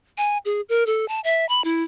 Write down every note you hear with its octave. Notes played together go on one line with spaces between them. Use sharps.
G#5
G#4
A#4
A4
A5
E5
B5
E4